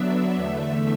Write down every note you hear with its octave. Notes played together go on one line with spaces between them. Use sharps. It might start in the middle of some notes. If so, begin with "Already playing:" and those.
Already playing: D3 F#3 B3 D4 E5
E2 D3 A3 E5